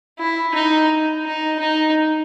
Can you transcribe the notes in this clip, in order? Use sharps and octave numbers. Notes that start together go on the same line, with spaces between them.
E4
D#4
D#4
D#4